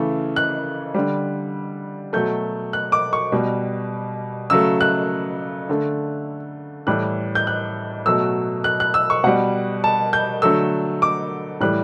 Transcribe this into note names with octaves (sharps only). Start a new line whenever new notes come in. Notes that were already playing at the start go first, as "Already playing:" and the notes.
Already playing: C#3 E3 A3
F#6
D3 G3
B2 F#3 A3 G6
F#6
D6
C#6
B2 G3
C#3 F#3 A3 E6
F#6
D3 A3
A2 E3 G3 F#6
G6
F#6
B2 F#3 A3 E6
F#6
F#6
E6
C#6
B2 G3 F#5
A5
G6
D3 F#3 A3 E6
D6
A2 E3 G3 F#6